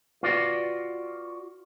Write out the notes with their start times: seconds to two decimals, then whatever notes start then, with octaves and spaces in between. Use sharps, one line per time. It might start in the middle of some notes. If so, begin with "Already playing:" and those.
0.23 F4 F#4 B4 D5